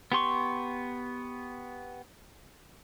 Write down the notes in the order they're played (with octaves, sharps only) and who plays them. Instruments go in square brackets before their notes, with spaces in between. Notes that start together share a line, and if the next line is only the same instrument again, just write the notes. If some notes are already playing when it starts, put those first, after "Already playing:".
[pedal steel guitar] B3 G4 C6 C#6